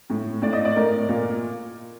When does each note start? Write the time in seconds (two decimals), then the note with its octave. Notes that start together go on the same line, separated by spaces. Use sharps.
0.10 A2
0.42 A2 D5
0.53 D#5
0.65 D5
0.76 A2 A#4
1.09 A#2